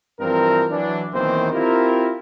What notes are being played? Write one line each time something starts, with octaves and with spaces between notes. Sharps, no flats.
G2 E3 F3 C4 A#4
E3 F#3 D4
B1 D#3 E3 A#3 C4 C5
C4 E4 F4 G4 A#4